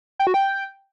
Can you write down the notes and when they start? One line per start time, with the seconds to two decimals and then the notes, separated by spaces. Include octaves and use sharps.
0.19 G5
0.27 F#4
0.34 G5